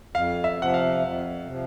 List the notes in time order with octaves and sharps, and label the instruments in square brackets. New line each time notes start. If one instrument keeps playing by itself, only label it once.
[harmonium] F2 [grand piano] F5
[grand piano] E5
[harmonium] C3 F3 [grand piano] F#5
[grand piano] F5
[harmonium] F2
C3 F3